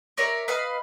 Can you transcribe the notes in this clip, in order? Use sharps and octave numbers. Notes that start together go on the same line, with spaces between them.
A#4 C#5 D5 E5
B4 D#5 F5 B5